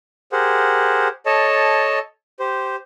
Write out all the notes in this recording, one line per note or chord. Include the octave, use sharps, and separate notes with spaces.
G4 G#4 A#4 C5 F#5
A4 C#5 D#5 A5
G4 C5